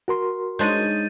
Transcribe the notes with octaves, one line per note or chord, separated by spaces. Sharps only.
F#4 A#4 C6
G#3 D4 D#4 C5 C#5 G6 A6 D#7